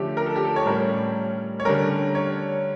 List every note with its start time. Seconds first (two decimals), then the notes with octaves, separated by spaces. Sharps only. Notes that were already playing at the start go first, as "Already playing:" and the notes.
Already playing: D3 F3 A3 C#4 G4
0.17 A#4
0.26 A4
0.36 G4
0.44 A4
0.56 C#5
0.66 A2 G3 C#4 A#4
1.60 C#5
1.65 D3 G3 C#4 A#4
2.15 C#5